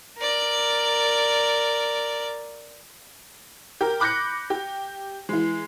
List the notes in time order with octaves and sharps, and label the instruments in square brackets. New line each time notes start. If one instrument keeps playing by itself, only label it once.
[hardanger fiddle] A#4 D5
[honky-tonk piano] G4 A#4
B5 D6 F#6 G6 A#6 C#7
G4
E3 G#3